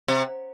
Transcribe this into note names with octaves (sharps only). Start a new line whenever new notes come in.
C3